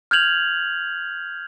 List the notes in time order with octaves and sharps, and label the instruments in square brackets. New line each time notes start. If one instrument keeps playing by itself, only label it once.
[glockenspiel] F6 G6 G#6 F7 F#7